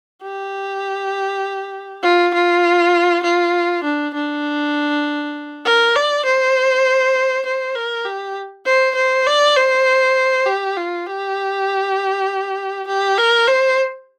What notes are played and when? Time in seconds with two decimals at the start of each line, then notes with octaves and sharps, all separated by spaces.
0.22 G4
2.03 F4
2.34 F4
3.23 F4
3.84 D4
4.14 D4
5.65 A#4
5.95 D5
6.25 C5
7.46 C5
7.75 A#4
8.05 G4
8.66 C5
8.95 C5
9.27 D5
9.56 C5
10.46 G4
10.77 F4
11.06 G4
12.87 G4
13.18 A#4
13.48 C5